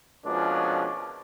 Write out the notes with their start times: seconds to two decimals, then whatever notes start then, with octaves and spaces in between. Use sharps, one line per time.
0.24 B2 F3 G#3 A#3 C#4 D4